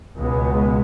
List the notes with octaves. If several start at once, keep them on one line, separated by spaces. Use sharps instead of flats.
C#2 B2 G#3 B3